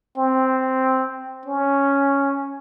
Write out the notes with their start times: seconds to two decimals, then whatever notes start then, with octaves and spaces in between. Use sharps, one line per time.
0.17 C4
1.45 C#4